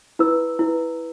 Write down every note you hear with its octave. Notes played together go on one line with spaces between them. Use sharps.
E4 B4 E6
E4 B4